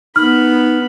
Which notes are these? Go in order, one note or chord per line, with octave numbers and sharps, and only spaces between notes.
B3 D#4 B5 F6